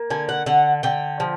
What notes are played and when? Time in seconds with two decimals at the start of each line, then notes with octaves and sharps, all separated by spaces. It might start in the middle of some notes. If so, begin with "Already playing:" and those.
Already playing: A#3
0.10 D3 G#5
0.29 F#5
0.46 D3 F#5
0.83 D3 G5
1.20 F3